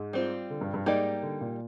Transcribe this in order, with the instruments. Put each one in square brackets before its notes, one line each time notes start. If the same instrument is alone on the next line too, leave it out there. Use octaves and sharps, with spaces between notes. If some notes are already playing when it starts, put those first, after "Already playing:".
Already playing: [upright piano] G#2
[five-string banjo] G3 C4 F4
[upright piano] D3
G2
G2
[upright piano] G#2 [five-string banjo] G3 A#3 D#4 G4 D5
[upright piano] D3
A#2